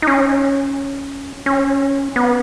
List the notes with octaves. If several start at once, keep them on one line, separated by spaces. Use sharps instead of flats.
D#4
C#4
C#4
B3